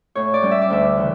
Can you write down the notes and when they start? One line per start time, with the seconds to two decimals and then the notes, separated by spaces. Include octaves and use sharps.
0.15 A2 C#5
0.34 D5
0.42 G3 C#4
0.51 E5
0.61 D5
0.70 D2 E5
0.97 C#3 E3